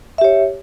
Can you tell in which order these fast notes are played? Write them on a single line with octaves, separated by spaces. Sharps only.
E5 G4 C#5